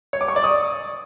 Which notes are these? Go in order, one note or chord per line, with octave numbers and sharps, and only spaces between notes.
C#5
D6
C#6
D5
D#6